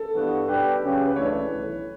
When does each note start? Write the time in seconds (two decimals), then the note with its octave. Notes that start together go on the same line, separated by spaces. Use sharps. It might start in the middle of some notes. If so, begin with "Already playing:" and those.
Already playing: A4
0.14 G2 E3 B3 F#4
0.48 B2 G3 D4 G4 B4
0.83 C#3 F#3 C#4 G4
1.07 B4
1.16 C#2 C#3 E3 A3 D4 C#5
1.50 B1 A2 E3